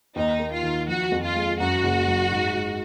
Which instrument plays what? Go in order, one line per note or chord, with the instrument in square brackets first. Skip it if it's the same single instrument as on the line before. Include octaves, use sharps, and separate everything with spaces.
[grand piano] D#2 [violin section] D#4
[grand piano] A#3
[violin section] F4
[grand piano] D#3
[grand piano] F3 [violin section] F#4
[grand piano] F2
[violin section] F4
[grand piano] G#3
[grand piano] F#2 [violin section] F#4
[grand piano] F#1
F#2
G#2
G#2